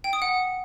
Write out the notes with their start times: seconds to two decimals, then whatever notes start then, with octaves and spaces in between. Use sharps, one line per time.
0.04 G5
0.13 D#6
0.22 F#5